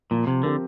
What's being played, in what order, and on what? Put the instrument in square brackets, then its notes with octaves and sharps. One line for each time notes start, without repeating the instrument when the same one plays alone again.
[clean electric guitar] A#2 [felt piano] F3
[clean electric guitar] C3
[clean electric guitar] D3 [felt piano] C4 G4 A#4